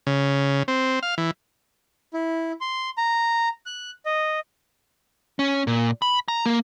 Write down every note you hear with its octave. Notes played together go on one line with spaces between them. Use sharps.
C#3
C4
F5
E3
E4
C6
A#5
F#6
D#5
C#4
A#2
B5
A#5
A#3